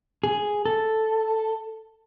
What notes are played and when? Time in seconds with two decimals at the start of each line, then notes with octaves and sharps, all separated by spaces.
0.23 G#4
0.65 A4